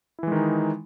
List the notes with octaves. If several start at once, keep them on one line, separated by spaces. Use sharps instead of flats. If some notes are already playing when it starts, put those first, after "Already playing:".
D#3 E3 G#3 D#4 E4